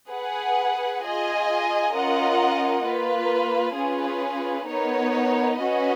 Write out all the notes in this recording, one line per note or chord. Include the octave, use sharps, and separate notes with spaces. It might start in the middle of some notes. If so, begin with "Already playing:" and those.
G#4 B4 F#5
F4 G#4 D#5 G#5
C#4 F4 A#4 D#5 F#5
A#3 F4 B4
C#4 F4 G#4 B4
B3 D#4 A#4 C#5
C#4 F#4 B4 D#5